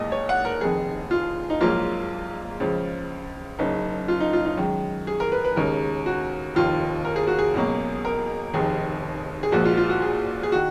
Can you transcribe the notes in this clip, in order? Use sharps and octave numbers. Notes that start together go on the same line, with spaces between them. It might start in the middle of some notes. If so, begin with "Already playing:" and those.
Already playing: B1 A#2 G#3 D#5
C#5
F#5
A#4
F1 F2 D#3 G#4
F4
D#4
A#1 G#2 F#3 A#3 F4
C#2 C#3 F3
F#1 F#2 C#3 D#4
F4
D#4
F4
D#4
F#2 D#3 G#3
G#4
A#4
B4
B4
D#2 C#3 G#3 A#4
F#4
F1 D#2 D#3 F4
A#4
G#4
F#4
G#4
C#2 B2 F#3 A#3
A#4
F1 D#2 D#3 G#4
G#4
A#1 A#2 F3 G#3 F#4
F4
F4
F#4
G#4
G#4
D#3 F#4